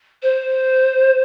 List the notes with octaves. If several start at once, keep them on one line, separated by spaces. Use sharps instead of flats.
C5